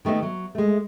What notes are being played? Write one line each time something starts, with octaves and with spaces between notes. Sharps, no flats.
D#3 A3 B3 D#4 A4
F#3
G#3 A3